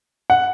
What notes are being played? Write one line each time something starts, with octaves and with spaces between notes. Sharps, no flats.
F#5